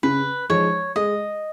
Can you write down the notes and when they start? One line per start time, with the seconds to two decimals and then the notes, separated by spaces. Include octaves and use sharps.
0.03 C#3 B4
0.50 F3 G#3 D#4 C#5
0.96 G#3 D#5